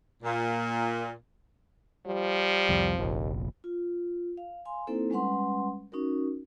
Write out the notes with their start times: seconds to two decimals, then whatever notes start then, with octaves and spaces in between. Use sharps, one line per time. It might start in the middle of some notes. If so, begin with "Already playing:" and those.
0.23 A#2
2.07 F3 G3
2.69 C2 F2
2.99 F1 A#1 D#2
3.64 F4
4.37 F5
4.65 F5 G#5 C6
4.87 A#3 C4 D#4 E4 A4 C5
5.10 G3 G#3 C#4 B4 F#5 C6
5.92 C#4 D#4 F#4 A#4